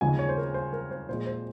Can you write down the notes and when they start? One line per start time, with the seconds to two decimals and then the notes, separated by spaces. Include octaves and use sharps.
0.01 D#2 C#3 F3 G#3 G#5
0.19 C#5
0.29 C5
0.37 A#4
0.54 C5
0.73 A#4
0.91 C5
1.09 A#2 F3 G#3 C5
1.27 C5